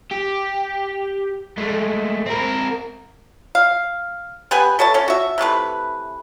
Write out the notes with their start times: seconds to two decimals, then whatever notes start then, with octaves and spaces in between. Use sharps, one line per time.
0.11 G4
1.58 G#3 A3
2.26 C4 A#4
3.55 F5
4.51 B3 G4 B4 G#5
4.79 A4 C#5 E5 A5
4.94 C#4 A4
5.08 F#4 E5
5.38 C3 E3 A3 B4